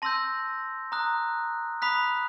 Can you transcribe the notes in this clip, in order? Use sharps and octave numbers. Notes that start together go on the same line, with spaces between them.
A5 C6 E6 G6 A#6
A#5 D#6 F#6
B5 D#6 F#6 B6